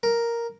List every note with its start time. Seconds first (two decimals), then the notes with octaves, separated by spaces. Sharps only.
0.03 A#4